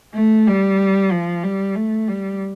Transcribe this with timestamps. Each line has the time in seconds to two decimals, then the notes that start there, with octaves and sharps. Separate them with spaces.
0.15 A3
0.47 G3
1.11 F3
1.43 G3
1.76 A3
2.08 G3